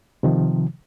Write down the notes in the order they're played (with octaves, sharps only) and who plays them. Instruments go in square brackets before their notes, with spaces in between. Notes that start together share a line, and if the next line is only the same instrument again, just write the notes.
[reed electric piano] C3 D#3 F3